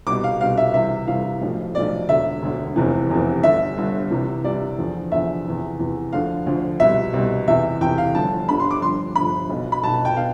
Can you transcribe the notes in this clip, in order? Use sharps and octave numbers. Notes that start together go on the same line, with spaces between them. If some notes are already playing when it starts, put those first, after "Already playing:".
C2 B2 D6
F5
C2 B2 F5
E5
C2 C3 E3 E5
C2 C3 E3 F5
B1 A2 F3
B1 A2 F3 D5
E1 D2 D3 E5
E1 D2 D3
F1 E2 C3 E3
F1 E2 C3 E3
G1 G2 D3 E5
G1 G2 D3
C2 C3 E3
C2 C3 E3 D5
E2 D3 F3
E2 D3 F3 E5
E2 C3 E3
E2 C3 E3
D2 D3 F3 F5
D2 D3 F3
C2 B2 E5
C2 B2
E2 C3 E3 E5
E2 C3 E3 G5
F5
G1 G2 D3 F3 A5
G1 G2 D3 F3 B5
C6
D6
G1 G2 F3 C6
G1 G2 F3 B5
B1 B2
B5
B1 B2 A5
G5
B2 F5